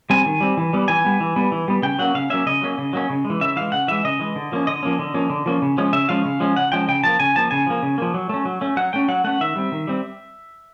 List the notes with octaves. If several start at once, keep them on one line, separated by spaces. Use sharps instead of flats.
G3 C4 G#5
D#3
G3 C4
E3
G3 B3
E3 G#5
G3 B3
E3
G3 B3
E3
G3 B3
C#3 G5
F#3 A#3 C#4 F#5
C#3 F5
F#3 A#3 C#4 E5
C#3 D#5
F#3 A#3 C#4
C#3
F#3 A#3 C#4
C#3
G#3
E3
C#3 E5
E3 G#3 F5
C#3 F#5
E3 G#3 E5
C#3 D#5
E3 G#3
D3
F3 A#3 C#4
D3 D#5
F3 A#3 C#4
D3
F3 A#3 C#4
D3
F3 A#3 C#4
C#3
F3 G#3 C#4
C#3 E5
F3 G#3 C#4 F5
C#3
F3 G#3 C#4
C#3 F#5
F3 G#3 C#4 G5
C#3 G5
F3 A#3 A5
C#3 G#5
F3 A#3 A5
C#3 G#5
F3 A#3
C#3
F3 A#3
F#3
A3 C#4
F#3
A3 C#4
F#3 F#5
A3 C#4 G5
F#3 F#5
A3 C#4 F#5
D#3 E5
G3 C4
D#3
G3 C4